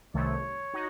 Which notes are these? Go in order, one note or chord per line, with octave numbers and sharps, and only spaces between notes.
C2 C3 D#3 A3 C#5
D#4 F#4